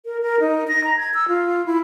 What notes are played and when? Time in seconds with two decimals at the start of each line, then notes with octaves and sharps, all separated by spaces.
0.05 A#4
0.22 A#4
0.40 D#4
0.68 A#6
0.84 A#5
0.97 G#6
1.14 E6
1.28 F4
1.66 E4